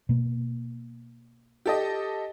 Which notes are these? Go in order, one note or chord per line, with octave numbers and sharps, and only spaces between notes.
B2 A#3
G4 A4 D#5